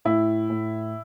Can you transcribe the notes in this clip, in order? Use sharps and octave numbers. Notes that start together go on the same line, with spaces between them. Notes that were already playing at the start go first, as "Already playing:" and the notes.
A2 E4
A2